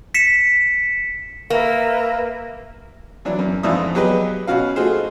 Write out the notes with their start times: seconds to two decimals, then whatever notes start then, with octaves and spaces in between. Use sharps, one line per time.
0.14 B6 C#7 E7
1.50 A#3 A#4 B4 E5
3.25 E3 F#3 D4
3.39 F#2
3.63 F2 G#2 E3 D4 E5 D#6
3.95 F#3 B3 G4 G#4 B4 D#5
4.47 B2 C#4 F#4 F5
4.76 A3 D#4 F4 F#4 G#4 C5